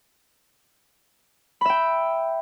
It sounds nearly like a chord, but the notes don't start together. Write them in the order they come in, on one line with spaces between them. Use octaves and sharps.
B5 E5 G5